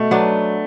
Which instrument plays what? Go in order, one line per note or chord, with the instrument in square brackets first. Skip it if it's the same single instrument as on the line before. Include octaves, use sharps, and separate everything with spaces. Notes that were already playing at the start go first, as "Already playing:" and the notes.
Already playing: [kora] B2 [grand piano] A3
[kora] F#3 B3 D4